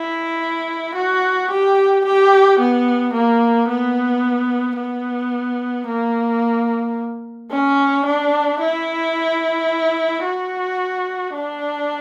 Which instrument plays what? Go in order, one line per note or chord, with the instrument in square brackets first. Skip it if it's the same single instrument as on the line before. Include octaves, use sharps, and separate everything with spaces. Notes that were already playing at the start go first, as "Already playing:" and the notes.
Already playing: [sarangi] E4
F#4
G4
G4
B3
A#3
B3
B3
A#3
C#4
D4
E4
F#4
D4